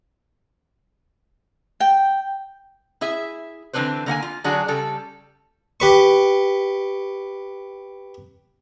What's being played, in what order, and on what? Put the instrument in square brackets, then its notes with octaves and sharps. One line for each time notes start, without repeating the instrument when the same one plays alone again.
[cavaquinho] G5
[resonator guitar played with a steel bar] E4 G#4 E5
D3 E3 C4 D4 B4 C5
D3 A#3 F#5 G#5
F4
D3 F#3 D4 F#4 G#4
C#3 G3 A4
[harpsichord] G4 B4 C#6